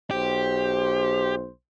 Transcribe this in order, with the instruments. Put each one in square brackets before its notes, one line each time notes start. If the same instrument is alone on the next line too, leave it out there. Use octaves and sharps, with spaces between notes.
[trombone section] B1 C5 [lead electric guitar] G4